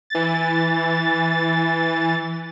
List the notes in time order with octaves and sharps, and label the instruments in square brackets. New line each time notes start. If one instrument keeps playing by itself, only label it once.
[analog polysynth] E3 A6